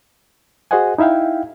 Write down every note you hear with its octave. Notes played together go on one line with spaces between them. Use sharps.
F#4 G#4 C5 D#5 F#5 G#5
D#4 E4 E5 F5 G5